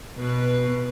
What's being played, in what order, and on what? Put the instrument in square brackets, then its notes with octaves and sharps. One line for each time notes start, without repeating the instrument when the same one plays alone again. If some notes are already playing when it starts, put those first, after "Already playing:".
[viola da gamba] B2 B4